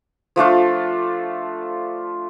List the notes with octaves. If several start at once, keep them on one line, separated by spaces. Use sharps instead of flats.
F3 A3 D4 F4